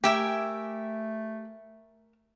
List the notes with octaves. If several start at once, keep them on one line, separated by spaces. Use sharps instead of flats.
A3 G4 A#4 E5 G5 G#5